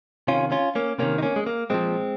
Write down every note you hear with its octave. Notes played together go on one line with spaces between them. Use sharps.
C3 D#3 C#4 F4
C#4 F4
A#3 C#4
C3 D#3 A#3 C#4
D#4
A#3 C#4
G#3
A#3
A#2 F3 G#3 C4